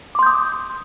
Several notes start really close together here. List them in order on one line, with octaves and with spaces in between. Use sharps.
D6 C6 G6 D#6